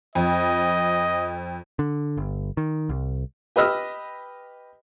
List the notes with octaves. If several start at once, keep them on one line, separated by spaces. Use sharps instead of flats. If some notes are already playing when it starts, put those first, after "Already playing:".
F2 D#5
D3
G1
D#3
C2
G4 B4 D#5 E6 F6